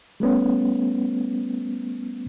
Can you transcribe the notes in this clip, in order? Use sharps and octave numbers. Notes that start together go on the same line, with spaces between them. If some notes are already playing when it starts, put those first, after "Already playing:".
G3 A3 B3 C#4